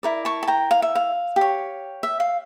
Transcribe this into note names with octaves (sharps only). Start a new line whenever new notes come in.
E4 A#4 D5
A5 C#6
A5
G5 A#5
F5
E5
F5
G4
C#5
E5
F5